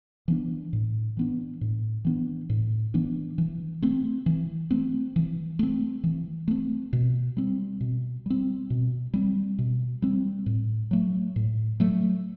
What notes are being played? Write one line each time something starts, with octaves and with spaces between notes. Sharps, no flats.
E3 B3 D4
A2
E3 B3 D4
A2
E3 B3 D4
A2
E3 B3 D4
E3
A3 C4
E3
A3 C4
E3
A3 C4
E3
A3 C4
B2
G3 C4
B2
G3 C4
B2
G3 C4
B2
G3 C4
A2
F#3 A3
A2
F#3 A3